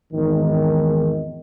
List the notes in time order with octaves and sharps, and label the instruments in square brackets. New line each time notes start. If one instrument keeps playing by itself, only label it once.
[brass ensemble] G#1 E2 D#3